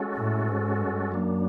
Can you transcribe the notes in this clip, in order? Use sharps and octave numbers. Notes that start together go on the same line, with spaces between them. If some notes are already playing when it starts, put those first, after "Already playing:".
Already playing: G#3 C#4 F#4 A4
A2
G#2
G2
F#2 F#3 A#3 D4